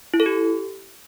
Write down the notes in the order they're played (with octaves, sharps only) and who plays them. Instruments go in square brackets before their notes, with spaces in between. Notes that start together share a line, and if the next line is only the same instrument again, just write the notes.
[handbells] E4
A4
G4